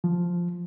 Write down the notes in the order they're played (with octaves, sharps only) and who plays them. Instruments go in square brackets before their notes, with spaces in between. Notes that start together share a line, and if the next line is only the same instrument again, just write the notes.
[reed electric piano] F3